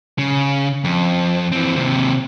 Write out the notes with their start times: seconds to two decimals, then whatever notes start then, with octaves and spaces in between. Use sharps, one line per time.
0.19 C#3
0.84 F2
1.52 E3 C4
1.76 D#2 C3